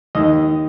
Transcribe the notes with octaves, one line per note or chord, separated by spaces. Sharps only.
D#2 D#3 D#5